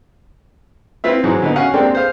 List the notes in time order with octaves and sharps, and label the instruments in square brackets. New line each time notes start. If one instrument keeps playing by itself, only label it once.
[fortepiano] C4 E4 F4 B4 E5
G#2 E3 F#3 G#3
D3 B3 D#4
C#4 F#4 F5 F#5 G#5
G#3 A#3 C4 D4 G4 A4
G#4 C5 F5